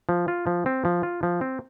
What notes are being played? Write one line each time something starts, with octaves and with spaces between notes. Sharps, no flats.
F3
F4
F3
C4
F3
F4
F3
C4